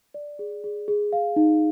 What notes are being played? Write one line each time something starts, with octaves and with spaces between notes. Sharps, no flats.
D5
G#4
G#4
G#4
F5
D#4